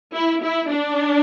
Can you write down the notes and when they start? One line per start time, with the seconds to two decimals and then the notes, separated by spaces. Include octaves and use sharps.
0.14 E4
0.42 E4
0.70 D4